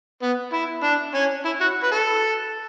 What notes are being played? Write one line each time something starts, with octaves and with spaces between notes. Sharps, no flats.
B3
E4
D4
C#4
E4
F#4
B4
A4